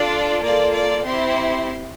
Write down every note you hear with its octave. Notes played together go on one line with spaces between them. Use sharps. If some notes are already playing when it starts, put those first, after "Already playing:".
Already playing: D4 F4 A4 D5
A#3 F4 A4 D5
D5
C4 E4 G4 C6